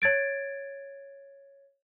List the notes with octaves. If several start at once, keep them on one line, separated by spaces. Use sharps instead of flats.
C#5 G#6 A6 D7